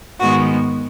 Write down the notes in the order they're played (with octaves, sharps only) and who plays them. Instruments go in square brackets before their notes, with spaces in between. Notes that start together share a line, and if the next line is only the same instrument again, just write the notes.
[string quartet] G#2 D#3 G#3 B3 F#4